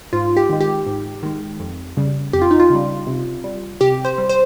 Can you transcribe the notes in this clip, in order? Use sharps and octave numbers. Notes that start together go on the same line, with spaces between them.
G#2 F4
G4
D#3 G#3
G4
G#2
D#3 G#3
F2
C#3 G3
F2 G4
F4
D#4
F4
C#3 G3
C3
G3
C3 G4
C5
G3
C5